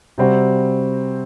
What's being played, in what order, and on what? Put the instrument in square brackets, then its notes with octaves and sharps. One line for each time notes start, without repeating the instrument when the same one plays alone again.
[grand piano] C3 G3 C4 F#4